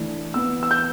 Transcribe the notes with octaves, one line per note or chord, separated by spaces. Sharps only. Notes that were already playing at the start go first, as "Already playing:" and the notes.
Already playing: E3 A3 D4
E3 B3 E4 E6
E6
G6